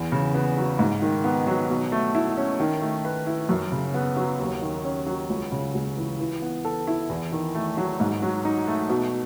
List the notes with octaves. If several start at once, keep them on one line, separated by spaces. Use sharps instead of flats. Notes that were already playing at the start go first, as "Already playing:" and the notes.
Already playing: E2 E3
C#3
B3
F#3
G#2
D#3
B3
F#3
B2
A3
E4
C#4
D#3
A3
B4
E4
F#2
C#3
B3
F#3
D#2
D#3
C#4
F#3
C#2
C#3
C#2
E3
E3
B3
A4
E4
E2
D#3
A3
F#3
G#2
F#3
D#4
A3
B2